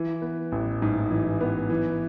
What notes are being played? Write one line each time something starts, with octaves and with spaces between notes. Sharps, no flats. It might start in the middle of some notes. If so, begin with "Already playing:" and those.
Already playing: E3
B3
A1
G#2
E3
B3
E3